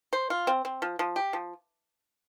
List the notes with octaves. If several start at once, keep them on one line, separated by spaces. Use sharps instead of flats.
C5
F4
C4
C4
F3
F3
G4
F3